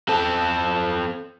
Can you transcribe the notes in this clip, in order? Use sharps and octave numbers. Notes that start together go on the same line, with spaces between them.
C4 A4